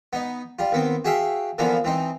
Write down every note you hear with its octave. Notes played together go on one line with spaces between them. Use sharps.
B3 D#4
G3 F4
D#2 B3 C4
F#4 G#4 E5 F5 G5
D3 E3 F3 A#3 B3
E3 C4 D#4